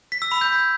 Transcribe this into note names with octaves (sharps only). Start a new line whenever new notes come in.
B6
E6
B5
G6